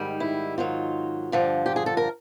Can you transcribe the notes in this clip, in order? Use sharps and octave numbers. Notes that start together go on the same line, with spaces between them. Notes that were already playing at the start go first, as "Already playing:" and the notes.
Already playing: G#2 D#3 G3
E4
G#2 D#3 F#3 F4
G2 D3 F3
G4
G#4
A4
A#4